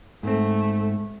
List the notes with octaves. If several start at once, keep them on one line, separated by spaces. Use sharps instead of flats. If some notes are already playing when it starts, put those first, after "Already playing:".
G#2 A3 C4